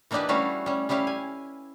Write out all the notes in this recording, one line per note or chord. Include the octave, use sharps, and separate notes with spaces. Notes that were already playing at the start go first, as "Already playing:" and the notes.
E3 A#3 D4 D#4 G4 B4
G3 A3 C#4 E4 F#4 F5
G3 C#4
G3 C#4 E4 G4 F5
G#5